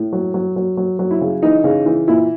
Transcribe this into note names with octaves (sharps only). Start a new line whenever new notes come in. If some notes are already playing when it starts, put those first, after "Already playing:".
Already playing: A2
F#3
F#3
F#3
F#3
F#3
E4
C#3
E3 D#4
C#3
E3
A#2 E4